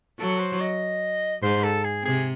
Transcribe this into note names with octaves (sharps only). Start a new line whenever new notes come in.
F#3 A4
C5
D#5
G#2 C5
A4
G#4
C3 G#4